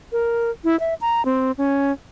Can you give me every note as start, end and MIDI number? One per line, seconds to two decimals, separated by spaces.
0.12 0.50 70
0.64 0.79 64
0.80 0.94 76
1.01 1.24 82
1.25 1.52 60
1.58 1.92 61